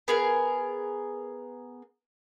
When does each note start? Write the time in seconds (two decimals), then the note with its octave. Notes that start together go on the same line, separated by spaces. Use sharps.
0.08 B3 G#4 A#4